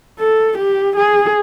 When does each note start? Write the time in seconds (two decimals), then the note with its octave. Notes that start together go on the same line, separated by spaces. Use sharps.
0.20 A4
0.58 G4
0.96 G#4